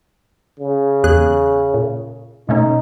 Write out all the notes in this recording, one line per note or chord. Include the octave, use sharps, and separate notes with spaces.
C#3
E2 G#4 F#6
A#2
B2 A3 C#4 D#4